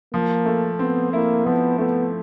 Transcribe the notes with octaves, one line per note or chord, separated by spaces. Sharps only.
F3 A#3
A3
B3 C4
A#3 E4
F3 B3
A3 B3